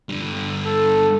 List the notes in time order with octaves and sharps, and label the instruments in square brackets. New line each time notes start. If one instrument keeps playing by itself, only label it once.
[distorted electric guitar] G2 D3
[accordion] A4